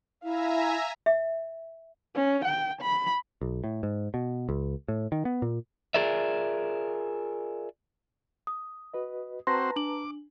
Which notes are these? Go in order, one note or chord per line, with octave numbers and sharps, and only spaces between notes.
E4 E5 F5 G#5 A#5
E5
C#4
G5
B5
B1
A2
G#2
B2
C#2
A2
D#3
B3
A#2
F4 G#4 A#4 D5 E5
D#6
F#4 B4 D#5
C4 F#4 B4 C5 A5 A#5 C6 A#6
D4 D6 F#7